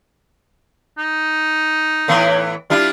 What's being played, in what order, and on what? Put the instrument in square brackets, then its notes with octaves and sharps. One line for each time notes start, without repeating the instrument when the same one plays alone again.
[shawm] D#4
[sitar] A2 E3 B3
[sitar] G3 D4 E4 [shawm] F4